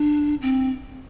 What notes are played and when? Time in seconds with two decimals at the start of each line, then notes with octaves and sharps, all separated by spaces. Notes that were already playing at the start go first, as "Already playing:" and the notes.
Already playing: D4
0.41 C4